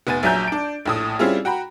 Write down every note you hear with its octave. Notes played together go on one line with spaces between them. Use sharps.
F1 B3 G#5 A6 D#7
A#1 F#3 E5 G#5 A#5 G6
D4 D7
A#1 A2 D#6
G3 C4 C#4 E4 F4 G#4
F#4 G5 A#5 B5